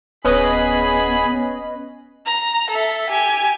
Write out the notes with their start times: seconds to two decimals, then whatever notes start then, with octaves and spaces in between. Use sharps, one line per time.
0.24 D1 B3 C#4 G#4 B4 D#5 B5
2.26 A#5
2.70 A4 E5
3.10 G4 G#5